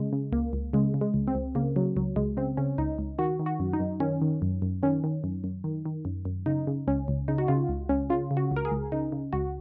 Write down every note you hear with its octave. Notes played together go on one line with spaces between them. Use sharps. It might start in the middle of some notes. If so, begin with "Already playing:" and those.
Already playing: C#3 G#3
C#3
C#2 A#3
C#2
C#3 G#3
C#3
G#3
C#2
C4
C#2
C#3 A#3
C#3 F#3
C#2 F#3
C#2 G#3
C#3 C4
C#3 C#4
C#2 D#4
C#2
D#3 F#4
D#3
F#4
F#2
D#4
F#2
D#3 C#4
D#3
F#2
F#2
D#3 C#4
D#3
F#2
F#2
D#3
D#3
F#2
F#2
C#3 D#4
C#3
C#2 C#4
C#2
C#3 D#4
F#4
C#3 F4
C#2
C#2 C#4
C#3 F4
C#3
F#4
C#2
A#4
G#4
C#2
C#3 D#4
C#3
C#2 F#4